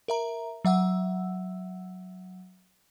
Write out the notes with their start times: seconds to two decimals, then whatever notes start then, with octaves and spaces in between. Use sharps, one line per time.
0.08 A#4 E5 A#5
0.65 F#3 E5 F#5 E6